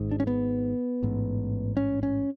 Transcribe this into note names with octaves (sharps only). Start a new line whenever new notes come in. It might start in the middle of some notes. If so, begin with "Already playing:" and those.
Already playing: G#1 G#2
D4
C#4
B3
A1 G#2
C#4
C#4